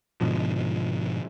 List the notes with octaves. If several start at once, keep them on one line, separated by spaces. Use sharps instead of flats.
G#2 B2 D3 F3